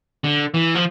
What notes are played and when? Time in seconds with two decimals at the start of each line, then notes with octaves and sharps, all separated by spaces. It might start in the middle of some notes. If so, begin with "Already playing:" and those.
0.24 D3
0.54 E3
0.75 F3